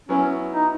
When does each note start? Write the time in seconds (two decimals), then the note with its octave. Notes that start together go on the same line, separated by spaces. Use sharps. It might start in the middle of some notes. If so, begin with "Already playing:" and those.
0.09 F#3 B3 C#4 E4
0.54 D#4